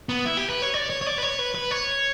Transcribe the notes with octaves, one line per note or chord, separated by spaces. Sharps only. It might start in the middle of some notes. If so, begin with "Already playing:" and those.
B3
E4
G4
B4
C#5
D5
C#5
C#5
D5
B4
C#5
B4
B4
C#5